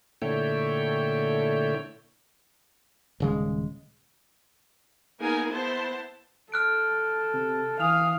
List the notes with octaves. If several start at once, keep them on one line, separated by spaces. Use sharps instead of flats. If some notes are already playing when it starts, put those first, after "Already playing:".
A#2 D3 A3 E4 C#5 G5
D#1 C#3 G#3
A#3 B3 D#4 G#4 A#4 G#5
B3 E4 C5 A5
A4 F6 F#6 D7
C3
E3 F5 G#5 D#6 F6 F7